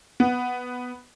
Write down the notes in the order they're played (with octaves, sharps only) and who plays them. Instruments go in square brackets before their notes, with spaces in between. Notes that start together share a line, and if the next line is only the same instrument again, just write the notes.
[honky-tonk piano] B3